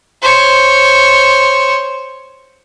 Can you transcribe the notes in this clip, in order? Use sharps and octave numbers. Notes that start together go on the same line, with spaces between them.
C5 C#5